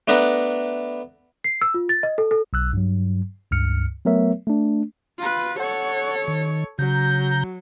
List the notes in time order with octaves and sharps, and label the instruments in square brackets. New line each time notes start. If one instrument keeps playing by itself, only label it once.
[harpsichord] A3 B3 D4 B4 A#5
[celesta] C7
E6
F4
A6
D#5
A4
A4
[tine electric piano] B1 E6 F#6
G2 F#3
C#2 G2 F6 C#7
F#3 A3 B3 A#4 C#5 E5
A3 D4
[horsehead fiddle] F4 B4
[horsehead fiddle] A4 C#5 [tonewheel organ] F#5
[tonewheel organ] D#3
[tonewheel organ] C#3 A#5 G6 [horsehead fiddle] F#3